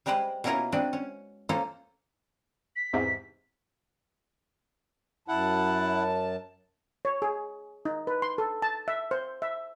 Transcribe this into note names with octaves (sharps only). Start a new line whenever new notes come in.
G3 G#3 G4 B4 C5
B2 A#3 C#4 E4 F4 A#4
G#3 C4 D4 F#4 B4
C#4
A#3 C#4 F4 A4 C5 F5
B6
E2 G#2 C3
F#2 E4 F#5 A5
C#5
G#4
D#4
B4
C6
A4
A5
E5
C5
E5